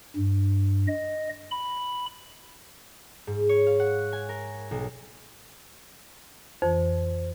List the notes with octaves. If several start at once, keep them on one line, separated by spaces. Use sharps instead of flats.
G2
D#5
B5
G#2
C#5
F5
F#5
G#5
A#4
B1
F2 E3 C5